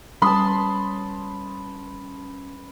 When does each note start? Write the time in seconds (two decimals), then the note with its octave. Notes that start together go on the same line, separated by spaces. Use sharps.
0.22 G3 C#4 B4 A5 B5 C6 D#6